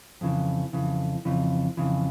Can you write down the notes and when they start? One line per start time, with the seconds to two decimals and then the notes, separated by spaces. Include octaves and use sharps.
0.21 F2 C#3 E3
0.73 F2 C#3 E3
1.25 F2 C#3 E3
1.77 F2 C#3 E3